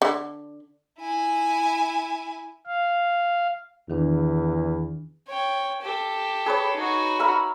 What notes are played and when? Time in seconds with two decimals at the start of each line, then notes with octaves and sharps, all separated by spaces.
0.02 D3
0.99 E4 G#5
2.67 F5
3.90 E2 D#3 D4
5.28 C#5 G5
5.82 G4 A4
6.46 G#4 B4 C#5
6.76 D#4 F#4
7.19 A#4 E5 B5